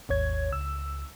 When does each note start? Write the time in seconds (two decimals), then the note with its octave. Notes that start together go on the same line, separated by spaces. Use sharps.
0.09 G#1 D#2 C#5 G#6
0.52 C#2 E6